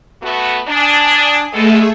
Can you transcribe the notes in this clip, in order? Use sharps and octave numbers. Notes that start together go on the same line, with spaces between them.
A3 B3 F#4
D4 G#5 D#6
B2 G#3 A3 G#4 A4 E5